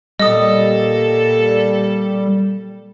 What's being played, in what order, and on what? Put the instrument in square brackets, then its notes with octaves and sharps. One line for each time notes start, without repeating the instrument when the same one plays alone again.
[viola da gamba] A#2 A4 [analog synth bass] G3 [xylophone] D#5 D#6